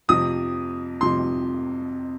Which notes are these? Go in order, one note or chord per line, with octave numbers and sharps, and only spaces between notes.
F2 C3 F3 D#6
F2 C3 F3 C6